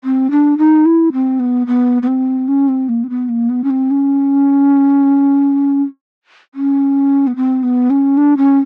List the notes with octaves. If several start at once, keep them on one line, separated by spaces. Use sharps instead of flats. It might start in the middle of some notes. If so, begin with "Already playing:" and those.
C4
D4
D#4
E4
C4
B3
B3
B3
C4
C#4
C4
A#3
C4
B3
A#3
B3
C#4
C4
C#4
C#4
B3
C4
B3
C#4
D4
C#4